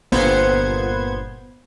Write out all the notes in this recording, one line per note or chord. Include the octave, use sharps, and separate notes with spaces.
G1 A#2 B3 C5 G#6